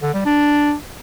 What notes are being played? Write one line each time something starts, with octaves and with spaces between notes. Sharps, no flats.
D3
G3
D4